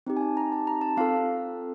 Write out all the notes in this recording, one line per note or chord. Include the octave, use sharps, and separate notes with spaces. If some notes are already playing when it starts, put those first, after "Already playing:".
C4 D#4 G4
G#5
A5
A#5
A5
A#5
A5
C4 F4 A4 F5